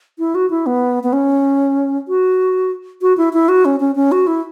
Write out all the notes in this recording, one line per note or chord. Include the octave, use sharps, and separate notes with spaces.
E4
F#4
E4
B3
B3
C#4
F#4
F#4
E4
E4
F#4
C#4
C#4
C#4
F#4
E4